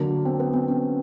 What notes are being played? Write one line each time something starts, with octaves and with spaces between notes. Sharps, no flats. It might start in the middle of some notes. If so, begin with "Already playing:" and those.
Already playing: D3 F#3 A#3
C4
B3
C4
C#4